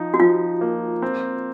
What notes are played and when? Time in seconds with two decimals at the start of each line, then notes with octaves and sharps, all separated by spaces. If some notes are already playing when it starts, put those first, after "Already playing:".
Already playing: F3 D#4
0.14 F#4
0.20 F3 F4
0.61 A#3
1.02 C4